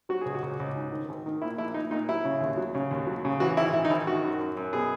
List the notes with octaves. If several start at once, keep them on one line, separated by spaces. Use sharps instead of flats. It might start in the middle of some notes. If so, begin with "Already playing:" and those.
F#3 F#4
C#2 G#4
F#4
C#2
C#2
G#2
D#3
G#1
D#3
A#2 E4
A#1 E4
A#2 D#4
A#2 D#4
F#3 E4
C#3
D#2
F#3
C#3
D#2
F#3
C#3
E3 F#4
G#1 E4
E3 E4
D#4
G#1 E4
D#3 F#4
F#2
F#2
F#2
B2 G#4